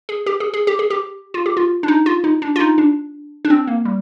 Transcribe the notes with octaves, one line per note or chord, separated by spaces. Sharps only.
G#4
G4
G#4
G#4
G4
G#4
G4
F4
G4
F4
D4
D#4
F4
D#4
D4
F4
D#4
D4
D4
C4
A#3
G3